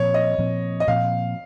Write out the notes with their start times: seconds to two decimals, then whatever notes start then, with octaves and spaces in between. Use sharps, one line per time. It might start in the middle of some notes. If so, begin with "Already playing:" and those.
Already playing: A#2 F3 C4 C#5
0.14 D#5
0.38 A#2 F3 C4
0.80 D#5
0.88 A#2 F3 C4 F5